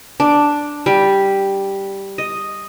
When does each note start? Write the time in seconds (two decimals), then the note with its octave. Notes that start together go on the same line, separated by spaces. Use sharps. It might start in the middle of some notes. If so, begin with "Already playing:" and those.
0.20 D4
0.86 G3
2.18 D#5